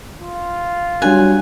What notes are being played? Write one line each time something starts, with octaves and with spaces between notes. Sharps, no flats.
F4
F#3 G3 D4 G#5 F#6